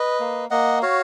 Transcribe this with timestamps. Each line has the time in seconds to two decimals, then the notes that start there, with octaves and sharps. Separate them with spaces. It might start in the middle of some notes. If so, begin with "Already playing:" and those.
Already playing: B4 D#5
0.20 A#3
0.51 A#3 D#5 F#5
0.82 F#4 C#5 F5